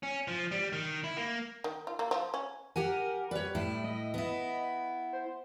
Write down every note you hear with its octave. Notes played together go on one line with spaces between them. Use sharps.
C#4
F3
G3
D#3
E4
A#3
D#3
F4
A#3
F3
C#4
G4 A#4 F#5 G#5
G3 B4 C#5
A2 E4
D#5
B3 E4
C5